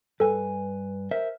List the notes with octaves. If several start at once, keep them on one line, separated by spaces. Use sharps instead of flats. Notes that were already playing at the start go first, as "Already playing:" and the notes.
G2 A4 B4 G#5
A#4 C5 E5